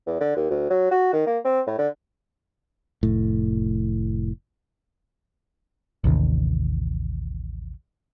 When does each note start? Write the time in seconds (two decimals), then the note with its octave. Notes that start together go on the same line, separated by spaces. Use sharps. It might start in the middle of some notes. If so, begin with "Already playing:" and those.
0.07 E2
0.21 D3
0.36 D#2
0.50 D2
0.70 F#3
0.91 F#4
1.13 D#3
1.27 A#3
1.45 C4
1.67 A2
1.78 D3
3.03 F1 A2
6.04 A1 D#2 C3 D#3